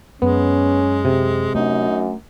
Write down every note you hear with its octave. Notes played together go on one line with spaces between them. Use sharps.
F#2 G#3 B3 C#4
C3
F#2 A3 D4 D#4